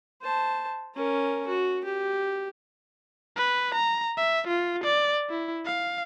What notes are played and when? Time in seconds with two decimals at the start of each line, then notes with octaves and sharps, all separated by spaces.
0.22 C5 A5
0.95 C#4 A#4
1.48 F#4
1.84 G4
3.36 B4
3.74 A#5
4.17 E5
4.48 F4
4.84 D5
5.30 E4
5.65 F5